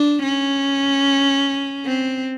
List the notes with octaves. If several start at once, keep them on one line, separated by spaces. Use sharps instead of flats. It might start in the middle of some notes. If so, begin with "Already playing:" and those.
Already playing: D4
C#4
C4